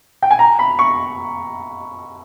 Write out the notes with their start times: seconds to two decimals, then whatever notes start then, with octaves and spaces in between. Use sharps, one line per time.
0.22 G5
0.31 G#5
0.39 A#5
0.59 B5
0.79 C#6